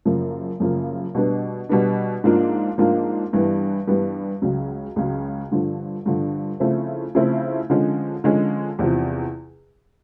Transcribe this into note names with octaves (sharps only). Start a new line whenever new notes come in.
F#2 C#3 F3 A#3
F#2 C#3 F3 A#3
B2 G3 B3 D4
B2 G3 B3 D4
G#2 F3 A#3 D4 F4
G#2 F3 A#3 D4 F4
G2 E3 G3 B3
G2 E3 G3 B3
C#2 C#3 F#3
C#2 C#3 F#3
G2 D3 F3
G2 D3 F3
C#3 F3 A3 C4 E4
C#3 F3 A3 C4 E4
D3 F3 G#3 C#4
D3 F3 G#3 C#4
E2 C3 F3